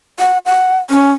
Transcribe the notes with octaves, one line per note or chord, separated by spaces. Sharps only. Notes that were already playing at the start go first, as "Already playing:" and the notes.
F#5
F#5
C#4